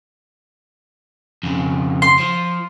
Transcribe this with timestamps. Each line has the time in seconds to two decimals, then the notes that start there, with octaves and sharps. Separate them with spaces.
1.43 F2 C#3
2.02 C6
2.20 F3